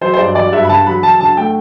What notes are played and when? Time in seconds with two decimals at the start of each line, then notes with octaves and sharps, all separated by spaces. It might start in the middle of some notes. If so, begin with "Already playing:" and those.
0.01 F#3 C5
0.14 C5
0.18 G2 D5
0.35 F#3 D5
0.52 G2 E5
0.64 B5
0.69 D3 A5
0.86 F#3 B5
1.03 F#3 A5
1.20 D3 A5
1.37 A3 G5